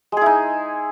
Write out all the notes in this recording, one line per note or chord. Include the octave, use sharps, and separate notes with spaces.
G#3 D#4 E4 G#4